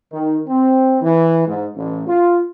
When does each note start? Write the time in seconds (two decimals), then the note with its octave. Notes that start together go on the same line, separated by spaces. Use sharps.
0.11 D#3
0.47 C4
1.01 E3
1.47 G#2
1.76 A1
2.07 F4